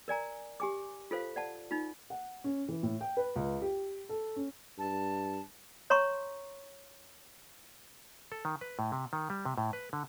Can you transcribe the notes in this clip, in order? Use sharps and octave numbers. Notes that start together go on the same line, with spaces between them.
A#4 D5 G#5 A#5
G4 G#5 D6
F4 A4 C5 F5
D5 F#5 A5
D#4 F4
F#5
C#4
E3
A2
G5
B4
C#2
G4
A4
C#4
G2 A5
C#5 A#5 C6 C#6
A4
D#3
B4
A2
C3
D#3
G3
C3
A2
B4
D3